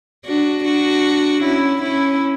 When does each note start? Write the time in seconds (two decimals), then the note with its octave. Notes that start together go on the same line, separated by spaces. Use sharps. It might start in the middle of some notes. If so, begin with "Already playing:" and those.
0.25 D4 F#4
0.64 D4 F#4
1.43 C#4 E4
1.82 C#4 E4